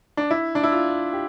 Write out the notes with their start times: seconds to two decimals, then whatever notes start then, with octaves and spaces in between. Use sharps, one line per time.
0.17 D4
0.31 E4
0.55 D4
0.63 E4
0.72 F4
1.13 G4